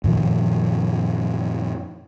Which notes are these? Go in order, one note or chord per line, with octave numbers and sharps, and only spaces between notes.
F#2 A#2 D#3 F3